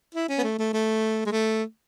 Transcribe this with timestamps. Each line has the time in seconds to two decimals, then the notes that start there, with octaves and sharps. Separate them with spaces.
0.14 E4
0.28 C#4
0.38 B3
0.43 A3
0.59 A3
0.73 A3
1.26 G#3
1.32 A3